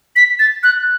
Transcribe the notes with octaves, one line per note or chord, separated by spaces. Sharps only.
B6
A6
F#6